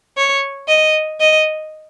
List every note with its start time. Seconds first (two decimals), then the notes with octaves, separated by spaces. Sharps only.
0.17 C#5
0.68 D#5
1.20 D#5